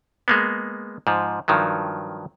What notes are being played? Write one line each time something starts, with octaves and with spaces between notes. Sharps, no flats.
G#3 A#3 B3
G#2 F3
G2 D#3 F3 F#3